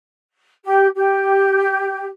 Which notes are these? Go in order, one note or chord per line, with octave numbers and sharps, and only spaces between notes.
G4
G4